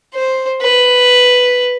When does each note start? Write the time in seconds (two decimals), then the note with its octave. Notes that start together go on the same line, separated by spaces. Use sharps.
0.14 C5
0.62 B4